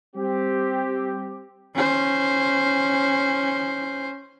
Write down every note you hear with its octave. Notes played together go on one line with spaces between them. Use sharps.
G3 C4 G4
C#4 C5